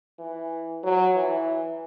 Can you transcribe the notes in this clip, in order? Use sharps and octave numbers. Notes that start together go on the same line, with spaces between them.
E3
F#3
E3